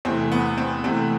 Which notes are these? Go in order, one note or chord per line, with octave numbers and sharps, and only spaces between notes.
E2 C3 E3 A3 C4
B3
C4
E2 C3 E3 A3 C4